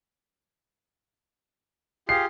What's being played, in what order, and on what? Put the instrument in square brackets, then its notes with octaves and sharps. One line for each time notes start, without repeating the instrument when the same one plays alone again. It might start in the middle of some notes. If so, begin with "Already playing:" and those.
[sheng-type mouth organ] F4 G4 G#4 [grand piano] C7